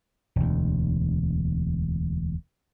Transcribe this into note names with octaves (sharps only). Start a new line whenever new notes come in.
E1 D2